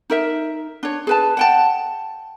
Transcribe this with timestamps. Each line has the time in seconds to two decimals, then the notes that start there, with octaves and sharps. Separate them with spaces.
0.10 D#4 A#4 E5
0.83 D4 C#5
1.07 G#4 B4 A5
1.37 F#5 G5 A5